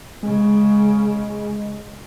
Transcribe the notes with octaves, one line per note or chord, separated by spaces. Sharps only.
C#3 G#3